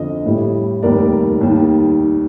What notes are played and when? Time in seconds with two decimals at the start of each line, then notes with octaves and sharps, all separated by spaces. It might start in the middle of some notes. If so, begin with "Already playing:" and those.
Already playing: F2 D3 F3 D#5
0.25 A1 A2 G3
0.82 F1 D#2 D#3 G3 A#4 D5
1.41 D#2 D#3 G3